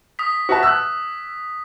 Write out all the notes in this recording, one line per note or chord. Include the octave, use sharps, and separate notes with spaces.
D#6 B6
F#4 E5 A5
E6 F#6